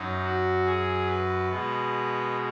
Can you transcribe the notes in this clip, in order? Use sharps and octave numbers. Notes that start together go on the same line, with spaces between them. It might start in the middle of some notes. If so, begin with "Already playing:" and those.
Already playing: F#2 F#3 D#4
F#4
G#4
B4
B2 G#3